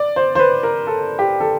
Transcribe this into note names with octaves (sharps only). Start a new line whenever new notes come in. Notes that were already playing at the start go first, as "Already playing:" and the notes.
Already playing: D5
C5
C5
B4
A#4
A4
G4
A4